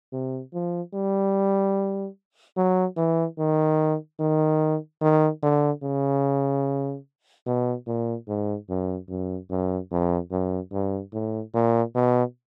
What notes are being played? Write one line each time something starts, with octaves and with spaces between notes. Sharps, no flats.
C3
F3
G3
F#3
E3
D#3
D#3
D#3
D3
C#3
B2
A#2
G#2
F#2
F#2
F#2
F2
F#2
G2
A2
A#2
B2